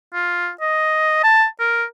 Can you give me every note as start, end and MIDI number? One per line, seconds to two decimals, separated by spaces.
0.14 0.50 65
0.61 1.21 75
1.24 1.45 81
1.60 1.84 70